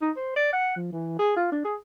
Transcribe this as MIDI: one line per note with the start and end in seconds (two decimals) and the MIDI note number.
0.02 0.11 63
0.17 0.35 72
0.36 0.52 74
0.53 0.74 78
0.76 0.91 53
0.93 1.16 52
1.19 1.36 68
1.36 1.47 65
1.52 1.62 62
1.65 1.75 68